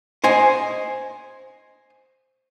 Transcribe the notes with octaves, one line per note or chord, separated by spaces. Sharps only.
C5 D#5 G#5